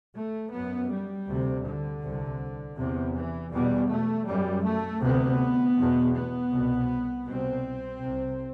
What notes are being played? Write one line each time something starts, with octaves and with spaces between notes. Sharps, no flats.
A3
F#2 B3
G3
D2 C3
D3
C2 C3
E2 C3
E3
E2 B2 G3
A3
F#2 G3
A3
D2 C3 B3
E2 B2
B3
C2 B2
C2 B2 C4
C2 C3